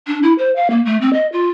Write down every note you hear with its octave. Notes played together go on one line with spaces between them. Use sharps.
D4
E4
C5
F5
A#3
A3
C4
D#5
F4